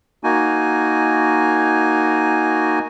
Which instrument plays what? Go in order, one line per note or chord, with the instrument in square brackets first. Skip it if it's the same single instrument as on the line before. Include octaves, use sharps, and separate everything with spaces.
[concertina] A#3 D#4 F#4 G#5